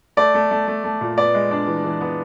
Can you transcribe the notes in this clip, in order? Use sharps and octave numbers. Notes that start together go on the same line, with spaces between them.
A3 D5
A3
A3
A3
A3
A#2
B3 D5
G#3
D4
E3
E3
B3